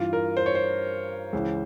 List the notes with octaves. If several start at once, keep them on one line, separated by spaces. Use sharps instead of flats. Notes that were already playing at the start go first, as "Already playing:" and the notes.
Already playing: G2 E3 F4
A#4
C5
C#5
C5
C#2 C#3 E3